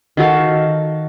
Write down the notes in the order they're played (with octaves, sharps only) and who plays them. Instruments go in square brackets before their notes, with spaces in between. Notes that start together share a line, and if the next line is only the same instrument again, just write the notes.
[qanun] D#3 F#4 A4 F5